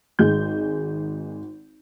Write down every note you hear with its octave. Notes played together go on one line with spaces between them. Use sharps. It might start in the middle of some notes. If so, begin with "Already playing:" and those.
G#1 G#3 G6